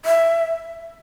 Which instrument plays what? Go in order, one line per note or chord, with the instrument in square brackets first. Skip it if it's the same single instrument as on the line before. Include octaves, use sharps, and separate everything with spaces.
[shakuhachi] E5